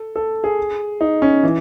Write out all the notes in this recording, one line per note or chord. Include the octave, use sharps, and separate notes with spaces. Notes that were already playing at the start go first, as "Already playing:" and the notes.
Already playing: A4
A4
G#4
D#4
C#4
E3